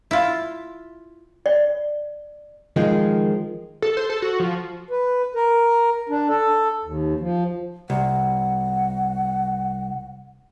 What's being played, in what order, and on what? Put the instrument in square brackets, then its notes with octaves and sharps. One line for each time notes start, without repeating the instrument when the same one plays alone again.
[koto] E4 F4
[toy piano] D5
[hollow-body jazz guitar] D#3 F3 G#3
[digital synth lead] A4
C5
A4
F#4
F3
[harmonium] B4
A#4
D4
A4
D#2
F3
[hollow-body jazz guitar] C2 [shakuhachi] F#5